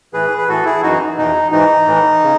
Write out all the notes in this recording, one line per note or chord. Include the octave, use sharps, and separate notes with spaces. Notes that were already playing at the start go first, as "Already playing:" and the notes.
A2 E3 G#4 B4
B4
A2 E3 F#4 A4
E4 G#4
F#2 E3 D#4 F#4
E2 B2 D#4
G#2 E3 D#4
A2 E3
C#3